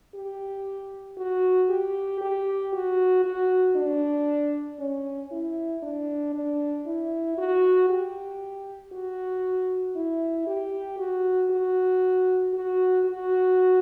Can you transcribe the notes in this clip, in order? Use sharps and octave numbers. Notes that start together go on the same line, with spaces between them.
G4
F#4
G4
G4
F#4
F#4
D4
C#4
E4
D4
D4
E4
F#4
G4
F#4
E4
G4
F#4
F#4
F#4
F#4